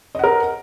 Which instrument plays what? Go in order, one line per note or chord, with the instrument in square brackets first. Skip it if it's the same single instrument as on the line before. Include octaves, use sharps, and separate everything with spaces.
[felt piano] D#5
F#5
A#4